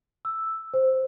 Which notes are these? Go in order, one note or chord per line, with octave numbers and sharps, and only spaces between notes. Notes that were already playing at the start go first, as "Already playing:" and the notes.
E6
C5